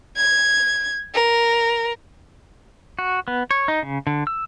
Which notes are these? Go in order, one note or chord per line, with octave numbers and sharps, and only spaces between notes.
G#6
A#4
F#4
B3
C#5
D#4
C#3
D3
E6